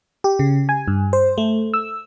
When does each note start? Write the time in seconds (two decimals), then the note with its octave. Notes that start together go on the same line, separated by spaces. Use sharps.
0.24 G4
0.39 C#3
0.69 G#5
0.88 G2
1.13 C5
1.38 A3
1.74 E6